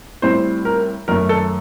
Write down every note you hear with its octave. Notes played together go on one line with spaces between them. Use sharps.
A2 G3 C4 C5
A#4
F#2 D#3 A3 A#4
A4